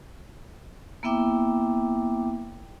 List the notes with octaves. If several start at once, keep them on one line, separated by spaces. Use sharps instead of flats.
A#3 B3 E4 E5 G5 D6